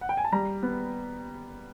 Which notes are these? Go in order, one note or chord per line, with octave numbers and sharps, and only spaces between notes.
F#5
G5
G#5
A5
G3 A#5
B3